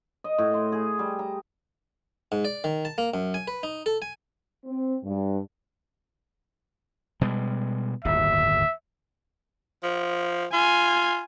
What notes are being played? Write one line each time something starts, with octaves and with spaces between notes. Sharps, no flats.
D#5
A2
C6
G#4
G3
A#5
G#2
D5
D#3
A5
A#3
F#2
G#5
B4
D#4
A4
G#5
C4
G2
B2 G3 G#3
D1 G1 D#2 E5
F3
F4 G#5